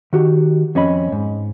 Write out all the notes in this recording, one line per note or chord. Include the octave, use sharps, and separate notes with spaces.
D#3 F#4 G4
F2 C#4 D#5 B5
G#2